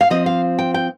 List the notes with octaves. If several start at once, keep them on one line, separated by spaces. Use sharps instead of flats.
F5
F3 C4 F4 D#5
F5
G5
G5